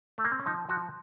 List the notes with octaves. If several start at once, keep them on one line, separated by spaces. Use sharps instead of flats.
A3
A#3
C4
C#4
F3 D#4
F3 F#4